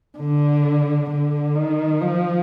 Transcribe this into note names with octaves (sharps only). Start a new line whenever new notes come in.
D3
D3
D#3
F3